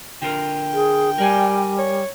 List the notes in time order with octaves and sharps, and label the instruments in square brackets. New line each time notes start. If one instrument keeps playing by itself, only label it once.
[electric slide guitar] D3 F4 A#4 [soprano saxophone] G5
[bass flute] G#4
[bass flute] G3 [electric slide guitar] A#4 D5 G#5
[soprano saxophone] C#5